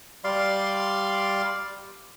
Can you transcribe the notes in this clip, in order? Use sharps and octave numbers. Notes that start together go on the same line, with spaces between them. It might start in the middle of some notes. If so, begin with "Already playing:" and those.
G3 D5 F5 C6